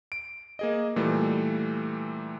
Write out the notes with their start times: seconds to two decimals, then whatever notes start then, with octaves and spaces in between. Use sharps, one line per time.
0.12 D7
0.59 A#3 G#4 D#5
0.96 A#2 E3 G3 A3